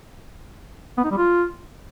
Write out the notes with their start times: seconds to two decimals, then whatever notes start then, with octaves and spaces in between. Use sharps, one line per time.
0.98 B3
1.04 D#4
1.11 G3
1.18 F4